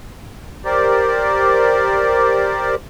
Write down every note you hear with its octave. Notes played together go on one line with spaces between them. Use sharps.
G4 A#4 C5 D5